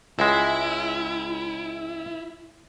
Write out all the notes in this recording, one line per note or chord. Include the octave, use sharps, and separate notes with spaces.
C#2 G#3 E4